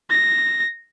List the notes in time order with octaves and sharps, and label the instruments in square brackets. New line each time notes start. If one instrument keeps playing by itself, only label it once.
[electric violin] A#6